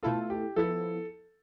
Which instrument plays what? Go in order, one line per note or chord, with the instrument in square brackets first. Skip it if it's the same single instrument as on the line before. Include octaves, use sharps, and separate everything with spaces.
[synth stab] B2 A3 E4 A4 [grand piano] F4
[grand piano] G4
[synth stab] F3 B3 E4 [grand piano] A4